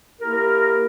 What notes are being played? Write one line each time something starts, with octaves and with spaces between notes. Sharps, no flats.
A#3 E4 G4 A#4